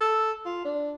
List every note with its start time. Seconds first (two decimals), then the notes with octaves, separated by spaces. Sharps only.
0.01 A4
0.45 F4
0.65 D4